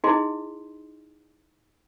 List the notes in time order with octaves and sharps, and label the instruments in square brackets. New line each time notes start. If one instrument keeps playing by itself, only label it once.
[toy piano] D#4 E4 G#4 D#5 C6